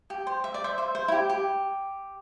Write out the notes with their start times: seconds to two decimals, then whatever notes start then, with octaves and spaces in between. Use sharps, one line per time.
0.10 G4
0.27 C5
0.44 E5
0.54 D5
0.64 C5 E5
0.78 C5 E5
0.95 C5
1.08 E4
1.12 G4
1.29 G4